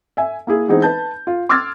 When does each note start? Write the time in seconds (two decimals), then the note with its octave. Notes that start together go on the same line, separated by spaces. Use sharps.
0.17 E5 G#5
0.47 A#3 E4 G#4
0.68 E3 G#3 B3 C4 D#4 G#4
0.82 B4 A5 G6
1.27 F4
1.49 C6 D6 E6 F6 G#6 A6